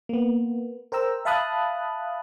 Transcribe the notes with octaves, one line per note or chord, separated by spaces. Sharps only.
A#3 B3
A#4 C5 G5 A#5 E6
E5 F5 A5 B5 D#6 F#6